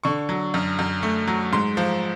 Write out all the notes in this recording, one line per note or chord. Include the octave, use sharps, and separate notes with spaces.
D3 C#6
F#3
F#2
F#2
A3
F#3
G#2 C6
F3